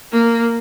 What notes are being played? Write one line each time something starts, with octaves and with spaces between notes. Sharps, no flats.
A#3